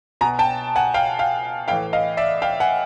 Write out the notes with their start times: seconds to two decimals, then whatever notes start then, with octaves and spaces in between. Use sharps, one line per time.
0.21 B2 G#5 A#5
0.39 G5 A5
0.76 F#5 G#5
0.94 F5 G5
1.19 F5 G5
1.68 A2 E3 F5 G5
1.93 D#5 F5
2.17 D5 E5
2.42 F5 G5
2.60 F#5 G#5